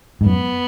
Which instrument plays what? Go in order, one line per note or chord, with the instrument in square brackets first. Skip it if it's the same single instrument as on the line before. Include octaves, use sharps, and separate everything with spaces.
[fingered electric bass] G#2
[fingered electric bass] F#2 [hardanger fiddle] B3